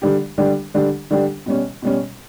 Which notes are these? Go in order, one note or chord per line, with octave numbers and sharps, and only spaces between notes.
D3 G3 D4 G4
D3 G3 D4 G4
D3 G3 D4 G4
D3 G3 D4 G4
B2 G3 C#4
B2 G3 C#4